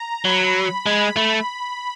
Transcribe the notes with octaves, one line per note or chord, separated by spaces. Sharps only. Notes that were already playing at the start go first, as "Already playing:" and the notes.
Already playing: A#5
F#3 B5
G#3 B5
A3